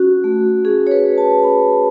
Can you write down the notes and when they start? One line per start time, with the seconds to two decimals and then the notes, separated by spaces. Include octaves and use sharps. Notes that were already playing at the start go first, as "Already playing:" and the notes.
Already playing: C#4 F#4
0.24 A3
0.65 C#4 G#4
0.87 C#5
0.91 B4
1.04 F#4
1.18 A5
1.43 C#4 B5